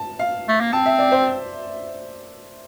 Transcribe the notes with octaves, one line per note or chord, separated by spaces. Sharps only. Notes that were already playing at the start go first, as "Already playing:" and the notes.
Already playing: A5
F5
A3
A#3
C4 A5
E5
D5
C5